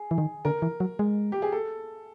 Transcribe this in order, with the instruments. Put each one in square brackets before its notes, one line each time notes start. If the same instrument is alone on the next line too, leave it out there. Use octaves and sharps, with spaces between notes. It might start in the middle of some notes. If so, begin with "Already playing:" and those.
Already playing: [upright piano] G#4
[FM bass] E3
D#3
[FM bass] D3 [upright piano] A#4
[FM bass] E3
F#3
G#3
[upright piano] G4
G#4
A4